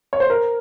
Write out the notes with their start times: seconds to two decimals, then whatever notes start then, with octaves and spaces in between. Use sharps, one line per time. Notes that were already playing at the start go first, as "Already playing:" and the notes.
0.13 C#5
0.20 C5
0.30 A#4